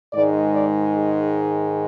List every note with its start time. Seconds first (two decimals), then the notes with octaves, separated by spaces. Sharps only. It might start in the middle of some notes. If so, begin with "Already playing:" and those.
0.13 G#2 D#3 G#3 D5
0.54 D5
0.95 G#4